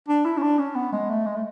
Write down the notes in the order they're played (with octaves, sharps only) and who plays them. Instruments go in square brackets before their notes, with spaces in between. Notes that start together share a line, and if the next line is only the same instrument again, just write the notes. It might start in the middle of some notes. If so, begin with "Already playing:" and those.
[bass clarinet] D4
E4
C#4
D4
C#4
B3
G#3
A3
G#3
A3